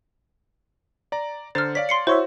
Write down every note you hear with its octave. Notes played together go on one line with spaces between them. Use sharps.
D5 A#5
D3 C5 A#5 F6 A6
C#5 D5 F5 B6
C6 C7 C#7
E4 F#4 C5 C#5 E5 C6